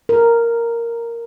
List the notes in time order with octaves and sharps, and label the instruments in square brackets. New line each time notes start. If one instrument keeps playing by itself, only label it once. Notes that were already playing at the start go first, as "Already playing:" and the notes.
[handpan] A#4